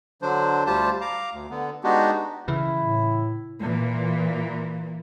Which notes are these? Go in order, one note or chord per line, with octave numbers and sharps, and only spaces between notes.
D3 F#3 D4 C5
D2 G3 F4 G4 C5 A5
F5 A#5 D6
D2
D3 B3
G#3 B3 D4 D#4 F#4 G4
C#3 E3 E4
A2
A#2 E3